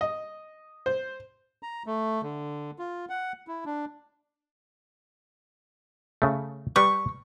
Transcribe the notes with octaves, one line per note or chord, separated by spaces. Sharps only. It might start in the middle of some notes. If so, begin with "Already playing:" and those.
D#5
C5
A#5
A3
D3
F4
F#5
E4
D4
C#3 A3
G3 B4 G5 C#6